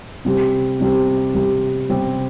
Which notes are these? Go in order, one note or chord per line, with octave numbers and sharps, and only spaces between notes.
C3 G3 C4 G4
C3 G3 C4 G4
C3 G3 C4 G4
C3 G3 C4 G4